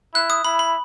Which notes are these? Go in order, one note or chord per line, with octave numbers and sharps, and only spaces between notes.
E4 F#6
D#6
E4 B5
B5